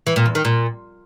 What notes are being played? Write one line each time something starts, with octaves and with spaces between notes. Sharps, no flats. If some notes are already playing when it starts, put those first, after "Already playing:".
E3
A#2
E2
D#3
A#2